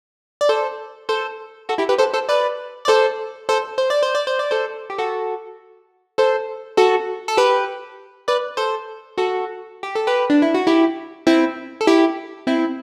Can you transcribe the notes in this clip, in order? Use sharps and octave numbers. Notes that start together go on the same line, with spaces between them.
D5
A4 C5
A4 C5
F#4 A4
E4 G4
G4 B4
A4 C5
A4 C5
B4 D5
D5
A4 C5
A4 C5
C5
D5
C5
D5
C5
D5
A4 C5
G4
F#4 A4
A4 C5
F#4 A4
A4
G4 B4
B4 D5
A4 C5
F#4 A4
G4
A4
G4 B4
D4
E4
F#4
E4 G4
C4 E4
A4
E4 G4
C4 E4